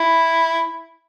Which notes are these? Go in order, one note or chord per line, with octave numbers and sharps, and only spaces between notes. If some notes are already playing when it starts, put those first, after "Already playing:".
Already playing: E4